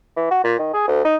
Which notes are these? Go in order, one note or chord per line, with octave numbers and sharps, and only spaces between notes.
E3
F#4
A#2
D#3
G#4
D2
D#4